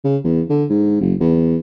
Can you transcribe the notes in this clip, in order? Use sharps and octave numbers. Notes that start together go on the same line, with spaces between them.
C#3
E2
D3
G#2
F#1
E2